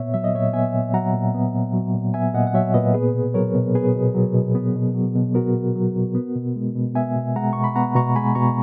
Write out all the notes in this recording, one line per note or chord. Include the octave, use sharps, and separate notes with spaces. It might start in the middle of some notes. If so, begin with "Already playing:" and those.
Already playing: A#2 B3 C#5 E5
F#3 E5
D#5
A#2 C#5 E5
B3 E5 G#5
A#2
F#3 F#5 A#5
A#2
B3
A#2
F#3
A#2
B3 E5 G#5
A#2 D#5 F#5
F#5
F#3 C#5 E5
A#2 B4 D#5
B3 G#4 B4
B2
F#3 A#4 C#5
B2
B3 G#4 B4
B2
F#3
B2
B3
B2
F#3
B2
B3 F#4 A#4
B2
F#3
B2
B3
B2
G#3
B2
B3 E5 G#5
B2
G#3 F#5 A#5
B2 C#6
B5
B3 F#5 A#5
B2 A#5 C#6
G#3 G#5 B5
B2 A#5 C#6